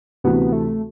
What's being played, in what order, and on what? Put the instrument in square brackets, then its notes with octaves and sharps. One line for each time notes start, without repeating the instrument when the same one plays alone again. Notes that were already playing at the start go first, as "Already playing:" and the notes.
[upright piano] D2 C3 E3 [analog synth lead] B3
[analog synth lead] A3